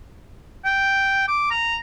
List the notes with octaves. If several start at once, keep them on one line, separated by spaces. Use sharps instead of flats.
G5
D6
A#5